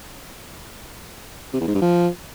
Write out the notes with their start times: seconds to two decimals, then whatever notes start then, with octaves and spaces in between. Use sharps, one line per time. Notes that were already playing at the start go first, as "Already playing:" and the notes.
1.53 C3
1.61 E2
1.68 G#2
1.75 G2
1.82 F3